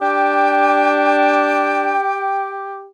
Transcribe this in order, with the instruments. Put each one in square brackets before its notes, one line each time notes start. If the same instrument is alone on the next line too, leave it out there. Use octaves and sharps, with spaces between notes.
[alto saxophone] D4 [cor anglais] G4 [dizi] G5